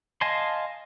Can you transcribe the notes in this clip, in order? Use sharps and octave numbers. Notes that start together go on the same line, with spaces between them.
D#5 F5 G#5 A5 C6